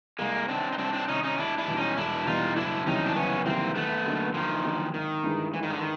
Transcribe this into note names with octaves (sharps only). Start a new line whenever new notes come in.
C2 G#3 A#3
C3 D#3 C4 D4
D#4
C2 C4 D4
C4 D4
C3 D#3 C#4 D#4
C#4 D#4
E1 D4 E4
D4 E4
E2 B2 G3
C#4 D#4
E1 D4 E4
E2 B2 G3 D#4 F4
F#1 D4 E4
E2 C3 D#3 G3 C#4 D#4
D4
F#1 B3 C#4
E2 C3 D#3 G3 A#3 C4
D#2 A3 B3
D3 F#3 A#3 D#4
D#2 D#3 F3
D3 F#3 A#3 D#4
G#1 D#3
G2 E3 G#3
G#1 E3
D#3
D3
D#3